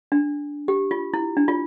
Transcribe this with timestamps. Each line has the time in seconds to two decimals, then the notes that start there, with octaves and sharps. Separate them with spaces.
0.12 D4
0.68 G4
0.91 F4
1.14 E4
1.37 D4
1.48 F4